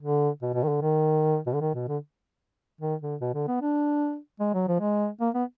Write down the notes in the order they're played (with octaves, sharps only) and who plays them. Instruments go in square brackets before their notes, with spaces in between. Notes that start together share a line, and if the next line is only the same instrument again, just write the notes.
[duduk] D3
B2
B2
D#3
D3
D#3
B2
D3
D#3
B2
D3
D#3
D3
B2
D3
B3
D4
G#3
F#3
F3
G#3
A#3
B3